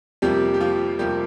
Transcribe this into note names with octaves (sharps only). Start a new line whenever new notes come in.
F2 C3 F3 G3 A#3 G4
G4
F3 F4
F2 C3 F3 G3 A#3 G4